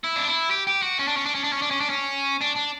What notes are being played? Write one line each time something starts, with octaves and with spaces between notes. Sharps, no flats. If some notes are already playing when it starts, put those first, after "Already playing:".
E4
D4
E4
G4
G4
F#4
C#4
D4
C#4
D4
C#4
D4
C#4
D4
C#4
D4
C#4
D4
D4